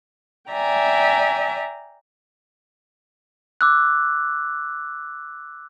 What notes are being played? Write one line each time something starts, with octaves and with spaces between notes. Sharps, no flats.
D5 E5 G5 G#5 A#5
D6 E6 F#6